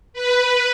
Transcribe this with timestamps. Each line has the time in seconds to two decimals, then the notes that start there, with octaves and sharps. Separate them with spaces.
0.13 B4